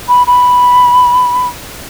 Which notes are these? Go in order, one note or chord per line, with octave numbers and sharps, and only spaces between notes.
B5
B5